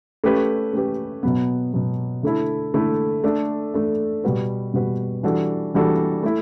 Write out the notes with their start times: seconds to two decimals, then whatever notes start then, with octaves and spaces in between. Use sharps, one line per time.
0.24 A3 C#4 G4 B4
0.73 A3 C#4 G4 B4
1.23 B2 F#3 B3
1.73 B2 F#3 B3
2.23 D3 A3 E4 A4
2.74 D3 A3 E4 A4
3.24 A3 D4 A4
3.74 A3 D4 A4
4.24 B2 G3 B3 F#4 B4
4.74 B2 G3 B3 F#4 B4
5.23 E3 G3 D4 F#4 A4
5.74 E3 G3 D4 F#4 A4
6.23 A3 E4